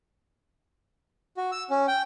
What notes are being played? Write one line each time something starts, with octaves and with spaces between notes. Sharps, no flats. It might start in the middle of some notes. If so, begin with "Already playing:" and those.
F#4
E6
C#4
G5